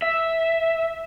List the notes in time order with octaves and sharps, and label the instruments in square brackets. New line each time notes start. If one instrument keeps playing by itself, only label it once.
[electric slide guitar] E5